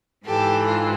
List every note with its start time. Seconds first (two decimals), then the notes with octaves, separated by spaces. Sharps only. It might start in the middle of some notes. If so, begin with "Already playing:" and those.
0.25 G#2 E3 G4 A4
0.66 F4